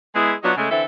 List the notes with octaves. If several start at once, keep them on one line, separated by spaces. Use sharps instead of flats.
G#3 B3 E4 G#4
F#3 B3 D4 D#4 F4 F#4
C#3 G#3 A3
D3 E3 C4 A4 E5